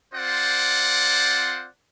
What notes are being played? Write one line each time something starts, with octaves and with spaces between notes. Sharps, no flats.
C4 F4 C5 D5 F#5